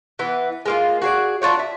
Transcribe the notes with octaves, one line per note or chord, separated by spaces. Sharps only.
E3 B3
G#3 A#3 F4
F#4 G#4 D5
D4 F4 F#4 C#5
E5